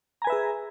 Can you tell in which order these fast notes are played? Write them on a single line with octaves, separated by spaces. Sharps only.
A#5 G#5 B4 E5 G#4